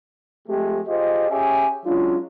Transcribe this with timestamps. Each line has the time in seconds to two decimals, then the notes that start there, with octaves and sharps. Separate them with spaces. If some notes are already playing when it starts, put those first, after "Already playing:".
0.48 F3 G#3 A3 C4 G4
0.87 F4 G4 G#4 C5 D#5
1.31 C#4 G4 G#4 E5 G#5
1.86 F#3 G#3 C#4 D4 F4